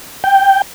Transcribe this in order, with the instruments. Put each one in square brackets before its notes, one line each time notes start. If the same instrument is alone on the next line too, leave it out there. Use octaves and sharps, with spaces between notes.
[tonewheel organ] G5